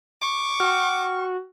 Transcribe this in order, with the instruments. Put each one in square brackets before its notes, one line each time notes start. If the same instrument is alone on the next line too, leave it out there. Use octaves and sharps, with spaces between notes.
[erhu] C#6 [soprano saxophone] D6
[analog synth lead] F#4 [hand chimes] G5 F6